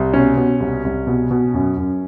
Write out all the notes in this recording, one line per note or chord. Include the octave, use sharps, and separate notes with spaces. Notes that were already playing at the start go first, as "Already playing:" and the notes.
Already playing: C2
B2 C#4
B2
C2
C2
B2
B2
F#2
F#2